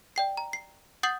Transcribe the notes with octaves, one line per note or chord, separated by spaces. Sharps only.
D5 G5 C7
A#5
C7
F#5 D#6 G6 A6 C7 F#7